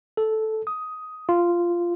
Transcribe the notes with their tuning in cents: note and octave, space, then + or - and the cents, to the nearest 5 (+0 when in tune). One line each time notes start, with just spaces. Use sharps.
A4 -5
D#6 +10
F4 -10